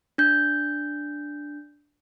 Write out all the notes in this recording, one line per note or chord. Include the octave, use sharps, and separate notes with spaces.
D4 G6